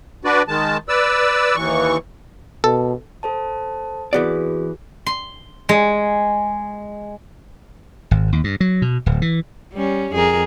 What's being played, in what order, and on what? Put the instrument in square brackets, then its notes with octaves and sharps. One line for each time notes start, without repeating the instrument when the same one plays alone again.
[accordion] D4 F#4 B4 D5
D#3 G#3 A5
B4 D5 E6
D#2 E3 C#6
[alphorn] B2 [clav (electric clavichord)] A4
[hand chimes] A4 C5 A5
[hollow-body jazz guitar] E3 B3 D5 [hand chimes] C4 F#4 G#4
[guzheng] C6
G#3
[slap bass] G#1
D#2
G2
F#3
B2
D1
E3
[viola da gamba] G3 C#4
F2 G#4 A#4